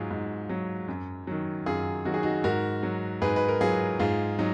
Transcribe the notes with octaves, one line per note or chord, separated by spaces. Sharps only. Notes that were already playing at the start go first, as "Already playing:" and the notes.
Already playing: G#2 F#3 F4 G#4
G#2
F#3
F#2
D#3 F#3
F#2 F4 G#4
D#3 F#3 F#4
G#4
D#4 F#4
G#2 F#4 A#4
F#3
G#2 G#4 B4
B4
A#4
F#3 F4 G#4
G#2 F4 G#4
F#3 D#4